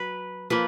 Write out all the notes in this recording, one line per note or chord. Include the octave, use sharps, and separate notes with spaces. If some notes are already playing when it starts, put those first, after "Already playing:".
Already playing: F#3 B4
F3 A#3 B4